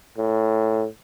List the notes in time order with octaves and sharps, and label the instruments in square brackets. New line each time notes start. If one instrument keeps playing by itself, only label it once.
[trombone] A2